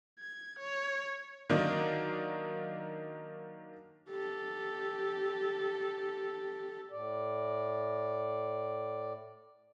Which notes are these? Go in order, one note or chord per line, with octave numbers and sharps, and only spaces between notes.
G#6
C#5
D#3 F#3 A#3 D4 D#4
G4 A4
A2 D5